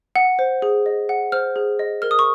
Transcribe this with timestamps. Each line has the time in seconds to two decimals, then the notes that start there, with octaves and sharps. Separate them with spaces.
0.16 F#5
0.39 C5
0.62 G#4
0.86 D#5
1.09 F#5
1.32 C5 F6
1.56 G#4
1.79 D#5
2.02 A#4 F6
2.11 D#6
2.19 C#6